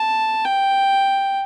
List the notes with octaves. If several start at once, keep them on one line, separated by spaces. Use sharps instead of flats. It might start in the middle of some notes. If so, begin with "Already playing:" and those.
Already playing: A5
G5